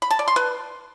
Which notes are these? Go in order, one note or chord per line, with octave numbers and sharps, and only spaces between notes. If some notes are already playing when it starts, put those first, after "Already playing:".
B5
A5
D5
C6
B4